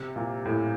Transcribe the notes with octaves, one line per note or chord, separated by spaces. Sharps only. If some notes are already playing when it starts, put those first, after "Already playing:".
Already playing: C3
A#2
A2